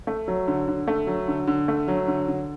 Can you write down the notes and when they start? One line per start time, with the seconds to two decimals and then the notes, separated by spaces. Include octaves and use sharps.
0.07 A3
0.28 F#3
0.48 D3
0.68 D3
0.88 A3
1.07 F#3
1.28 D3
1.47 D3
1.68 A3
1.88 F#3
2.08 D3
2.28 D3